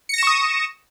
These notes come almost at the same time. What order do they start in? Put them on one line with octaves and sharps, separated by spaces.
C#7 A#6 E7 C#6 D#6